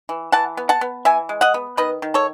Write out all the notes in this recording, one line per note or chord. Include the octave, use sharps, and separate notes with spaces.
E3
E3 F#5 A5
B3
F#5 A5
B3
E3 E5 G#5
G#3
D#5 F#5
B3
D#3 B4 D#5
D#3
A4 C#5